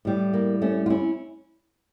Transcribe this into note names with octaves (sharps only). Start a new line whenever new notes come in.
A2 G3
A#3
A3 C#4
F4
C#4 E4